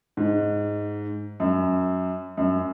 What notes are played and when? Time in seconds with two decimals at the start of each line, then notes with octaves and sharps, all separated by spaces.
0.17 G#2
1.40 F#2
2.37 F#2